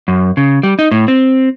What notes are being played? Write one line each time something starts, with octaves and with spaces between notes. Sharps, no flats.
F#2
C#3
G3
D#4
A2
C4